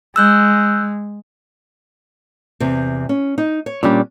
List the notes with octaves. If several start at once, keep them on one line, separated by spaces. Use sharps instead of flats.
G#3 E6 F#6 G6
E2 C3
C#4
D#4
C#5
A#2 G3 C#4 D4